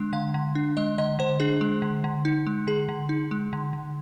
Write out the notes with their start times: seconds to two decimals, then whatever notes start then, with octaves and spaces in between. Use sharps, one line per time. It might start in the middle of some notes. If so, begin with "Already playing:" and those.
Already playing: D3 G#3 D4
0.13 D3 F5
0.34 D3
0.55 D4
0.77 G#3 D#5
0.98 D3 D#5
1.19 D3 C5
1.40 D4 G#4
1.61 G#3
1.82 D3
2.04 D3
2.25 D#4
2.47 G#3
2.67 D3 G#4
2.89 D3
3.09 D#4
3.31 G#3
3.53 D3
3.73 D3